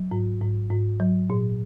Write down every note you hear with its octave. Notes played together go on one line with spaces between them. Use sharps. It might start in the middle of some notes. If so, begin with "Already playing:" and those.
Already playing: F#3
G#2
G#2
G#2
F#3
A#2